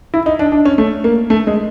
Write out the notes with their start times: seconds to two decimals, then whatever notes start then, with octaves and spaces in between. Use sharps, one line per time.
0.14 E4
0.26 D#4
0.39 D4
0.52 D4
0.65 C#4
0.78 A3
1.04 A#3
1.30 A3
1.47 G#3